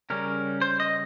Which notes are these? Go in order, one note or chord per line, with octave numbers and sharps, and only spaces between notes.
C#3 G3 C#4 A#4
C5
D#5